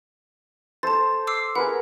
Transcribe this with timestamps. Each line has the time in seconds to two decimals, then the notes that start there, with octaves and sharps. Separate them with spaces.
0.83 A4 C5 A5 A6
1.27 D6 E6 C7
1.55 G#4 A#4 B4 F#5